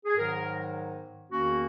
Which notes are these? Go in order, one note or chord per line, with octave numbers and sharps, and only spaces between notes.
G#4
G#2 D#3 F#3 B3 A#4
E2 D#3 A#3 C#4 F#4